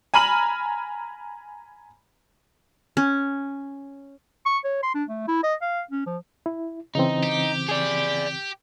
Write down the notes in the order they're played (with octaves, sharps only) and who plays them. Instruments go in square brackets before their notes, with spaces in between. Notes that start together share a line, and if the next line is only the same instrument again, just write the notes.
[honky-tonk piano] G#5 A#5 B5 F6 D#7 F#7
[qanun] C#4
[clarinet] C#6
C#5
C6
D4
A3
E4
D#5
F5
C#4
F3
[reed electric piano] E4
[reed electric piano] C#3 E3 C4 [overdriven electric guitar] D#4
[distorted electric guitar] G4
[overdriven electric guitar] G#4 D5